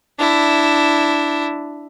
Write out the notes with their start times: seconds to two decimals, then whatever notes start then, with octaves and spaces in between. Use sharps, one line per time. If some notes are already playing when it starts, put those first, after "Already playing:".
0.19 D4 E4